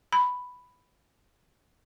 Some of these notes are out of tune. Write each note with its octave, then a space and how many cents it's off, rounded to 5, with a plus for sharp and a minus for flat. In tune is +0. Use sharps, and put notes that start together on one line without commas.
B5 +5